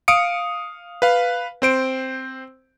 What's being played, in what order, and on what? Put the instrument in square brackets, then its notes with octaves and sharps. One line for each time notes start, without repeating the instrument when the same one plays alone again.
[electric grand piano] F5 D#6 C#7 D7
B4 F5
C4 C5 D7